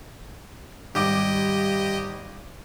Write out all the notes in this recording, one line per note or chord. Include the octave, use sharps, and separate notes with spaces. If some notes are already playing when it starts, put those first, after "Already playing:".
G#1 G3 G4 D#5 D6